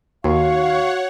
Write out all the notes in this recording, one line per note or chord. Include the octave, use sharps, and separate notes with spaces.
D#2 F#4 C#5 F5 F#5 C#6